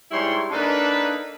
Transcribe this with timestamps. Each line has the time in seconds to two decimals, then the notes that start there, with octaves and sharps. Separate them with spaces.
0.12 G#2 G3 E4 C#5 C6
0.51 A#3 D4 D#4 A4 B4